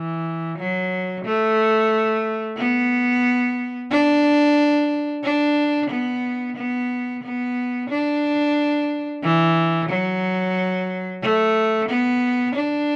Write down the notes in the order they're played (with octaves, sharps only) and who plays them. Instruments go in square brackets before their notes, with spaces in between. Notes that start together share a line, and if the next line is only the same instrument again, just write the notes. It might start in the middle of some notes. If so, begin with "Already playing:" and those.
Already playing: [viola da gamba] E3
F#3
A3
B3
D4
D4
B3
B3
B3
D4
E3
F#3
A3
B3
D4